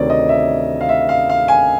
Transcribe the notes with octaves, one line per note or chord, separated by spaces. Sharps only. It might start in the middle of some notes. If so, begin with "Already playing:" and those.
Already playing: D2 C3 D#3 C#5 D5
D#5
E5
F5
E5
F5
F5
G#5